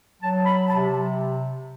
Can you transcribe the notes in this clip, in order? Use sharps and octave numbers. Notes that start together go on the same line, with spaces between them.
F#3 A5
B5
C3 A5